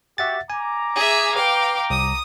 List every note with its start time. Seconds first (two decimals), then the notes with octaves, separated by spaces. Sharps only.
0.18 F#4 G4 E5 F#5 A6
0.50 G#5 A#5 D6
0.96 G#4 E5
1.35 B4 F5 G5
1.90 C2 D#6